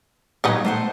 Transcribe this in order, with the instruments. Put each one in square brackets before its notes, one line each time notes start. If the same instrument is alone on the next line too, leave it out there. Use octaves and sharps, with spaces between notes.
[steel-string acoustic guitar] A#2 F#3 [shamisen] D#3 B3 D#4
[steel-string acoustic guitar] A3 C5 F#5